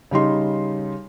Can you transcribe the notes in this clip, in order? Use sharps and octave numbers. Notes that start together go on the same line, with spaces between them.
C#3 G3 D#4 C6